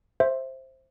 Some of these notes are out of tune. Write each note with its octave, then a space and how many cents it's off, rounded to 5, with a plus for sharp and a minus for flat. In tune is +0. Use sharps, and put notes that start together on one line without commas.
C5 +10 E5 +0